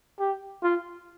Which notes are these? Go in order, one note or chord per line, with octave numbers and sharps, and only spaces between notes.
G4
F4